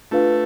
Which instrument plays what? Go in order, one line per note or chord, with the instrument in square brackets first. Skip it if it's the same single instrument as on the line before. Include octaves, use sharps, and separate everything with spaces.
[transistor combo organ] A3 [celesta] D4 F4 B4 F5